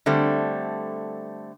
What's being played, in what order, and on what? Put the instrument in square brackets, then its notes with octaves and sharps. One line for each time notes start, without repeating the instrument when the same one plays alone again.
[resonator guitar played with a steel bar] D3 G3 A3 C4